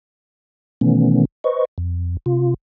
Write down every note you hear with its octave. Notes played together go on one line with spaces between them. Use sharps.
B2 D#3 E3 A3 B3 C#4
B4 C5 D#5 C#6
F2
C3 F4